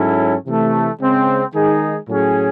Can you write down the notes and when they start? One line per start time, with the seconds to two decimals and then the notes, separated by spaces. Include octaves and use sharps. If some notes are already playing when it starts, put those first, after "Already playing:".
Already playing: G#2 F#3 C#4 E4 A4
0.46 C3 E3 A3
1.00 C#3 G#3 C4
1.54 D#3 G#3 D#4 G#4
2.09 A2 F#3 C#4 G#4